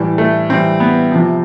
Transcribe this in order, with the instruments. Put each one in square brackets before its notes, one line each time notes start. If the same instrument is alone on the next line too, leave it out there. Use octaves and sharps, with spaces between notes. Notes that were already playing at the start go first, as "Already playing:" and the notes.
Already playing: [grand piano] A2 E3 G3
A3
A2 E3 G3 C4
B3
C3 F3